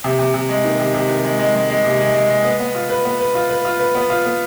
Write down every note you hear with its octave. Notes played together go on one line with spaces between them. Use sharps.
C3
C3
C3
G#3
D#3
C3
C3
D#3
G#3
G#3
G#3
G#3
C3
G#3
G#3
G#3
B3
B3
F4
B4
B3
B4
F4
B4
F4
B4
B3
F4
B3